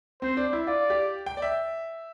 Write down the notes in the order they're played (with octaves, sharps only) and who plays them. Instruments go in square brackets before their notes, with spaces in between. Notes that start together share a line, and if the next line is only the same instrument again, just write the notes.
[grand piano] C4 [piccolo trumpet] C5
[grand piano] D4
E4
[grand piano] F4 [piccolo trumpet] D5
[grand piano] G4
G5
D5
E5